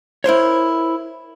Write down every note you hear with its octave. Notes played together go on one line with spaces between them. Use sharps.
E4 A#4 C5 C#5